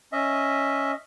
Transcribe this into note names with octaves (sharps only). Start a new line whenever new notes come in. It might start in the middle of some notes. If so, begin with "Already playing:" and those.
C#4 D#5 E5